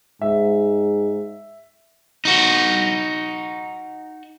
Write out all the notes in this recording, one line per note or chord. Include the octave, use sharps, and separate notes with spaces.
G#2 E5
D#4 F#4